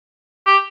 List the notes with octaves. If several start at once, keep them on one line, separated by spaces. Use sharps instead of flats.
G4